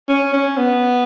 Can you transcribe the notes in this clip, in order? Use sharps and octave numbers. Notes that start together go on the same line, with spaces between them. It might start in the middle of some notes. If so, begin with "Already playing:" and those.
C#4
C#4
B3